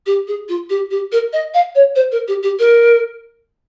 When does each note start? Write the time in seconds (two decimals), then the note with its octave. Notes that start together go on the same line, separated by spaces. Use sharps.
0.06 G4
0.27 G#4
0.48 F4
0.69 G4
0.91 G4
1.12 A#4
1.33 D#5
1.54 F5
1.75 C#5
1.95 C5
2.12 A#4
2.28 G4
2.43 G4
2.59 A#4